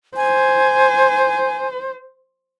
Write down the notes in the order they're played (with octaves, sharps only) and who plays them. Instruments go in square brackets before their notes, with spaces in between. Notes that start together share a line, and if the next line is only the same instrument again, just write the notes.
[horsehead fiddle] C5 [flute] G#5